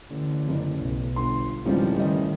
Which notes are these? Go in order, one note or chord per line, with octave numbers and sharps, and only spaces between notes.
A1 D3
F#1
B1
G1 C6
A1 F2 G#2 C#3 F3 G3
D#3 D#5